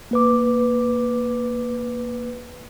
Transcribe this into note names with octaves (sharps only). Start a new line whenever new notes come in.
A#3 B4 D6